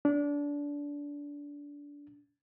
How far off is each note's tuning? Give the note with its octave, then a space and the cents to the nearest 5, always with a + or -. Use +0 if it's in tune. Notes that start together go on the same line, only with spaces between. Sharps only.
D4 -25